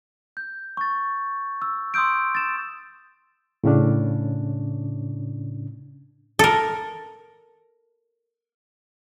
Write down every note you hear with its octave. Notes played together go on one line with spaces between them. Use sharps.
G6
C#6 A6
E6
C6 D#6 E6 G6 D7
A6 E7
A2 C#3 C#4 D4
A4 A#4